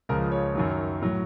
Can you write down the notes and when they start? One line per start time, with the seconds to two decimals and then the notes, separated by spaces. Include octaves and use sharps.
0.09 C#2 C#3 F3 A#4
0.32 C#5
0.55 F#2 D#3 F#3
1.01 A2 F#3